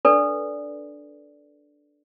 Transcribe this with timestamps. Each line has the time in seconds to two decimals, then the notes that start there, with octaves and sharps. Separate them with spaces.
0.05 D4 A4 B4 D5